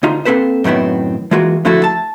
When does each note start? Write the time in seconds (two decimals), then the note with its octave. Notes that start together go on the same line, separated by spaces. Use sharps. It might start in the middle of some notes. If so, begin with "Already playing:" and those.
0.03 D2 D#4 F4
0.25 A#3 C4 A4 B4 C5
0.64 F#2 A2 D#3 B3 C4
1.31 E3 G#3 A#3 F4 F#4
1.65 D3 F3 A3 E4 F#4 A4
1.84 A5